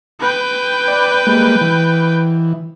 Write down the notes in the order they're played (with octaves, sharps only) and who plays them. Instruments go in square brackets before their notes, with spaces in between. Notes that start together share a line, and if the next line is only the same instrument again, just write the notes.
[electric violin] B4 G5
[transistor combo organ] D5
G3 G#3 A#3
E3